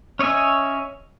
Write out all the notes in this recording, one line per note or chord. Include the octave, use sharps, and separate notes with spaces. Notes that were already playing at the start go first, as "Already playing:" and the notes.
C#4 C#5 D#5 E5 G#5